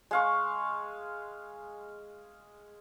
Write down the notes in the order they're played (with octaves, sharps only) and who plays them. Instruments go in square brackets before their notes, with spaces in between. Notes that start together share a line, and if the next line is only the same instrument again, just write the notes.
[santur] G#3 F5 C#6